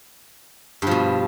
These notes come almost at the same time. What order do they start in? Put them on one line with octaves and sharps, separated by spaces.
G2 F3 B2